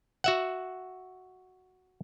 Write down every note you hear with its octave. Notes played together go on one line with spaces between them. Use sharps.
F#4 E5 F#5